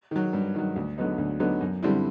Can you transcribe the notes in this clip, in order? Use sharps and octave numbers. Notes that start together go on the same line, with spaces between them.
D#3 F#3
G2
D#3 F#3
D2
D3 F#3 B3 D#4
D2
D3 F#3 B3 D#4
F#2
D3 G3 C4 E4